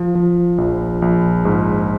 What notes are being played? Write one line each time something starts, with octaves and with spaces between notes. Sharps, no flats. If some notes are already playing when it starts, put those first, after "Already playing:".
Already playing: F3
F3
A#1
A#1
G#2